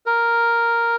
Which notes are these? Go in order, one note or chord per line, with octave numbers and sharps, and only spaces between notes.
A#4